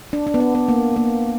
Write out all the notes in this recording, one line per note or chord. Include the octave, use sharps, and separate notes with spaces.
D4
D4
B3
D4
B3
A#3
A#3